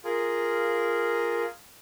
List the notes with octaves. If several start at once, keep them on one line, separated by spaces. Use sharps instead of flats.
F4 G#4 A#4